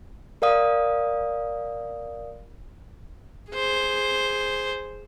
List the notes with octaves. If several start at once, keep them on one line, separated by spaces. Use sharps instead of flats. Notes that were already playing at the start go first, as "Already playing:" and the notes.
A#4 D5 F5 D#6
G#4 C5